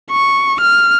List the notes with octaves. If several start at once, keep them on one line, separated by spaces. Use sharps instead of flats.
C#6
F6